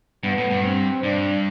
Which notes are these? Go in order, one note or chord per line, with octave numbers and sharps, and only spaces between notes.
G2 B3
A2
G2
C4
G2 D4